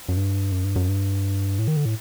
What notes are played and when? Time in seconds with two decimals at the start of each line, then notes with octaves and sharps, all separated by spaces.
0.09 F#2
0.17 G2
0.52 F#2
0.64 G2
0.76 F#2
0.88 G2
1.59 A2
1.68 D#3
1.77 D3
1.85 A2